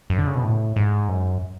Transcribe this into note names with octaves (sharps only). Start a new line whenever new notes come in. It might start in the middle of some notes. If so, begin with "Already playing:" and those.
F#2
D3
C#3
B2
A2
G#2
F#2